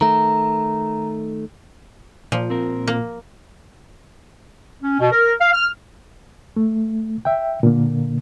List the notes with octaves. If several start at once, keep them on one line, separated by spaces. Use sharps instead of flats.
D#3 A3 A#5
A#2 F3
C4 A#4
A#3
C#4
B2
A#4
F5
F6
A3
E5 G5
A#2 D3 A#3